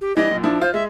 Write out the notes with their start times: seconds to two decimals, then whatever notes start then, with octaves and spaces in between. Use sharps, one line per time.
0.01 G4
0.17 E3 G3 D4 D#5
0.31 F#2 A#2
0.43 F3 D4 E4
0.61 F4 C5
0.74 G#3 E5